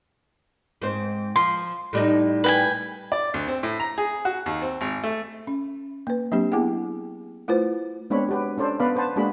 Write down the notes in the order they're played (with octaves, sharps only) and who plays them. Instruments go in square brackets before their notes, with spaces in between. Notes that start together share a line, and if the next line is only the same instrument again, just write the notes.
[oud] G#2 C4
[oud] F3 [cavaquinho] C6
[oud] A2 G3 D#4
[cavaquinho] B4 G5 G#5
[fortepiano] D5
D2
C4
A2
A#5
G#4
F#4
D#2
C4
G#1
A3
[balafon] C#4
A#3 B4
F#3 A#3 C4 D4 G4
B3 E4 G#4 F#5 G5
A3 E4 F4 B4 C5
[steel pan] G#3 B3 C4 D4 C#5 B5
F#4 G4 B4
C#4 D4 A4 C5 D5
B3 B4 D5 F5 B5
B4 C5 F#5 A5
G#3 A#3 D4 F#4 G#4 B5